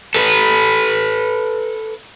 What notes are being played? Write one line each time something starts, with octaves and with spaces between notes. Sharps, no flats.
A4 B4